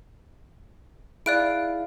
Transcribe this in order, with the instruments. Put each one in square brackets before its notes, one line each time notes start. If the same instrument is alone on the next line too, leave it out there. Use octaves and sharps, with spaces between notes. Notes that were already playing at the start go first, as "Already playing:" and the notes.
[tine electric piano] E4 G#4 F5 [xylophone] D5 F#6 D7